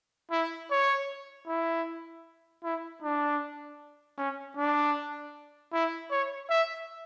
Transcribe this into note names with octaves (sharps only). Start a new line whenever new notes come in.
E4
C#5
E4
E4
D4
C#4
D4
E4
C#5
E5